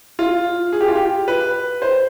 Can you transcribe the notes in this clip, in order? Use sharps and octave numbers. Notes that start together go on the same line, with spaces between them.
F4
G#4
G4
F4
G4
B4
C5